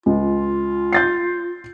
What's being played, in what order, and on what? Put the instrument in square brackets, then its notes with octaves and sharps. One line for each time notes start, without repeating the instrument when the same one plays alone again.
[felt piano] C#2 [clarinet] F4
[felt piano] G6 A6 C7